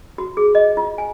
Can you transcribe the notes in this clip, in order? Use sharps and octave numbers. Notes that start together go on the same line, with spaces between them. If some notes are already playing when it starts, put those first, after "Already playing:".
F#4
G#4
D#5
F4
G#5